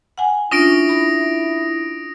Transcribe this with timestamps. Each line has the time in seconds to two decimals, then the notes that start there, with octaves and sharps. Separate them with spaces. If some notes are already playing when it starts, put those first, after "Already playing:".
0.18 F#5 G#5
0.51 C#4 D4 E4 F4 D#6 A#6 D7
0.89 B5